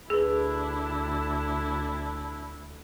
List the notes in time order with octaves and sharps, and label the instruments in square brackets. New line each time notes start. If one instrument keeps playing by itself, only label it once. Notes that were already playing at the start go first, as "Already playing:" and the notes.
[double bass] D2 [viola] D4 E4 [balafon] G#4 B4